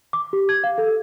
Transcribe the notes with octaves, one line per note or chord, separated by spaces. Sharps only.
D6
G4
G#6
F5
A4